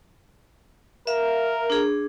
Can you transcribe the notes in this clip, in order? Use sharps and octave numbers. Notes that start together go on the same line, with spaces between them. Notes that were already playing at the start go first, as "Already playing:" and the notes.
A#4 E5 F5
D4 G#4